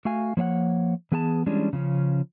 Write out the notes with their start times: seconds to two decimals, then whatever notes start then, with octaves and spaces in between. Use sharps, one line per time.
0.05 A3 F#4 F5 G#5
0.37 F3 A#3 C#5 F5 F#5
1.12 E3 B3 G#4 G#5 A5
1.46 E3 G3 G#3 C#4 D4
1.73 C#3 F3 C#4